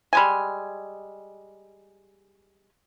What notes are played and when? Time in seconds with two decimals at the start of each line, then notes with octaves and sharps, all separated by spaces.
0.13 G3 G#3 G#5